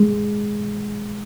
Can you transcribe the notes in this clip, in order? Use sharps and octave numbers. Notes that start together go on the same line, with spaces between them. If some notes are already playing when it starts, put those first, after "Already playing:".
Already playing: G#3